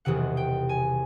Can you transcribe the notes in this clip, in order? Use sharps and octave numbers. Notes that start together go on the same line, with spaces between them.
E1 E2 C3 D#3 F#5
G5
G#5